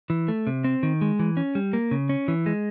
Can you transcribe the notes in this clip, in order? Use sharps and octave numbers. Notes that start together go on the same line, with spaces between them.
E3
A3
C3
C4
D#3
G#3
E3
C#4
G3
A#3
C#3
C#4
E3
G#3